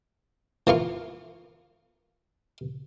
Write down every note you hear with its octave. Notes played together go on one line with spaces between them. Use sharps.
E3 A#3 F4 C#6